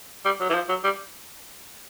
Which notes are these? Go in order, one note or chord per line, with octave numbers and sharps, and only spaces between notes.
G3
F#3
E3
F3
F#3
G3